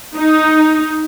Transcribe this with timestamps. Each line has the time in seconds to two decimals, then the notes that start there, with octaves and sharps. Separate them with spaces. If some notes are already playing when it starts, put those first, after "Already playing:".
0.15 D#4